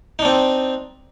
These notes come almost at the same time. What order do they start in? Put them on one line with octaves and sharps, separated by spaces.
D#4 D4 C4